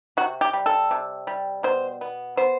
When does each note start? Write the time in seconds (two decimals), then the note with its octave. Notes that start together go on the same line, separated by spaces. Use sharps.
0.17 C3 F#4
0.41 G4
0.53 G3
0.66 A4
0.91 C3
1.27 G3
1.63 B2 C5
2.01 B3
2.37 B3 C5